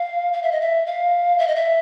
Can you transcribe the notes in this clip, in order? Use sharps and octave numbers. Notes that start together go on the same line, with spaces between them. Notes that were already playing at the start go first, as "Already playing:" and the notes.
Already playing: F5
F5
E5
D#5
E5
F5
E5
D#5
E5